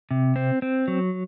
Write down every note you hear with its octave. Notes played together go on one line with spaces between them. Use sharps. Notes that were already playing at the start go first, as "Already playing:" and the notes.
C3
C4
C4
F#3